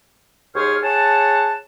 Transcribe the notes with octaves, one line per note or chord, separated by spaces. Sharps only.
D#2 G#4 C5 C#5 F6
G#4 C#5 F#5 A5